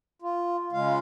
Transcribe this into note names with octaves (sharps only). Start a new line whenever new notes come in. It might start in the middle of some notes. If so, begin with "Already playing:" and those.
F4
C#3 G#3 F4 F5